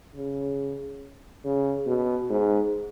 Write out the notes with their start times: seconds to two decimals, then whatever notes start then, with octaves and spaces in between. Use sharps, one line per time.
0.15 C#3
1.44 C#3
1.87 B2
2.30 G#2